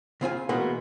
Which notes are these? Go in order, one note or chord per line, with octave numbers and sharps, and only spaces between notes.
C#3 C4 F4 G#5
B2 E3 G#3 A#3 B3